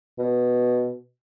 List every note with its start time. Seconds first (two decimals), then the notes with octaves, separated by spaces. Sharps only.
0.19 B2